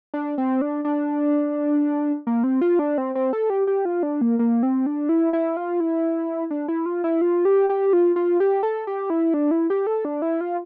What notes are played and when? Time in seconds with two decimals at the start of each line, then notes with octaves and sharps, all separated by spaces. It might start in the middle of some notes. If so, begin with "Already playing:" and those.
0.14 D4
0.38 C4
0.61 D4
0.85 D4
2.27 A#3
2.44 C4
2.61 F4
2.79 D4
2.98 C4
3.15 C4
3.33 A4
3.50 G4
3.67 G4
3.85 F4
4.03 D4
4.21 A#3
4.39 A#3
4.63 C4
4.86 D4
5.09 E4
5.33 E4
5.57 F4
5.80 E4
6.51 D4
6.68 E4
6.86 F4
7.04 E4
7.21 F4
7.45 G4
7.69 G4
7.93 F4
8.16 F4
8.40 G4
8.63 A4
8.87 G4
9.10 E4
9.34 D4
9.51 E4
9.70 G4
9.87 A4
10.05 D4
10.22 E4
10.41 F4